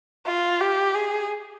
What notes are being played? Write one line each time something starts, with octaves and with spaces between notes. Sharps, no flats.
F4
G4
G#4